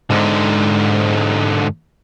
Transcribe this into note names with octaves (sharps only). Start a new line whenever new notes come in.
G#2 D3